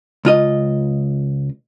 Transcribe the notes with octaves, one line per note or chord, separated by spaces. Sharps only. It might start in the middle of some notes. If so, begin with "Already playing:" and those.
C#2 F4 D#5